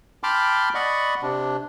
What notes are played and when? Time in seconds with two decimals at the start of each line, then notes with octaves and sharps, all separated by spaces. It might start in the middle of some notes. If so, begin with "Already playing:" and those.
0.23 G5 A5 B5 C6 D6 F6
0.75 D5 D#5 F#5 B5 C#6
1.22 C3 D4